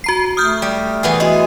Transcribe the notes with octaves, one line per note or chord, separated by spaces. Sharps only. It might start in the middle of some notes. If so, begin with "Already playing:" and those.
F#4 A#5 C7
A3 D#6 F6 G6
G3
E3 B3 G#4
F#4 G#4 D#5